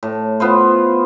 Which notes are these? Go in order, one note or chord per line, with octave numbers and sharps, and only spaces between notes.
A2
B3 F4 C5